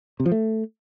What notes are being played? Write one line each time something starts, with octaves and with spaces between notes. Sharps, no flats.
C3
F3
A3